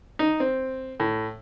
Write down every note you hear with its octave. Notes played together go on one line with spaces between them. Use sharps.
D#4
C4
A2